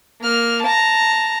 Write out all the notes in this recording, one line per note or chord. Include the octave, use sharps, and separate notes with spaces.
A#3 F6
A5 A#5